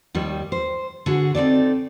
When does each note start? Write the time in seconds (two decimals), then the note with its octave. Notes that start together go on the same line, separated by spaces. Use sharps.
0.15 D#2 D#3 G3
0.52 C5
1.06 D3 F#4 G#4
1.35 C4 D#4 A4 D5